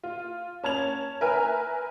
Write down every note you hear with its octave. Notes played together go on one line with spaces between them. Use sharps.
F4
C#4 A5 G#6 F7
A#4 B4 E5 G#5 F6